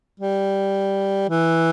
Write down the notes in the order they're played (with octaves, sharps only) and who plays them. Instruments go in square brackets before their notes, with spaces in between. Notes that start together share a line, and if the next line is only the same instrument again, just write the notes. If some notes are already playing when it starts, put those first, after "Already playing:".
[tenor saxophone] G3
E3